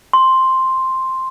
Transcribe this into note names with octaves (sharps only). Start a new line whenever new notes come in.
C6